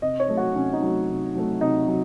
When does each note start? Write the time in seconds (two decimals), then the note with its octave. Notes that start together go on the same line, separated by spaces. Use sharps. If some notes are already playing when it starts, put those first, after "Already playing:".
0.02 C3 D#5
0.20 C#5
0.28 F#3 A3
0.37 F#4
0.56 C3 C#4
0.73 D#4
0.83 F#3 A3
1.09 C3
1.36 F#3 A3
1.61 C3 D#4
1.88 F#3